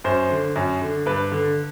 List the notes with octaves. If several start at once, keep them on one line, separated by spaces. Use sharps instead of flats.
F#2 C5
D3
F#2
D3
G2 B4
D3